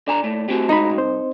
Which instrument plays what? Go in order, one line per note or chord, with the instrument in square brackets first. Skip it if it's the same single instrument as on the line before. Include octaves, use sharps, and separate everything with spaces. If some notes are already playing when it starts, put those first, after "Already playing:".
[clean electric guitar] D3 G#5 A#5 [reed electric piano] D5
[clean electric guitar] A#2 A3
[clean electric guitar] A3 C4 F#4 [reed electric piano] G4
[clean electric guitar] A2 G#3 F#4 [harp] D#4 [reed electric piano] A#5 B5
[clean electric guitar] C2 [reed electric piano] C4 C5